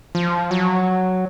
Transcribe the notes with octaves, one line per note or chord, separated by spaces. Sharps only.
F3
F#3